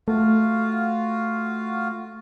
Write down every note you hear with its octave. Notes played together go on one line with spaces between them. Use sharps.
A3 F4 F#4 F5